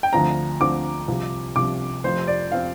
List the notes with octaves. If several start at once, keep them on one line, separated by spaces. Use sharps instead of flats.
G5
D2 D3 F3 C4 A#5
D2 D3 F3 C4 D6
C2 C3 F3
C2 C3 F3 D6
F1 F2 F3 C4 C5
D5
F3 C4 F5